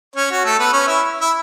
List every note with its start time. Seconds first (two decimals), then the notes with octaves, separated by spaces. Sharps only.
0.16 C#4 C#5
0.31 F#4
0.45 A3 A4
0.59 B3 B4
0.73 C#4 C#5
0.87 E4 E5
1.21 E4 E5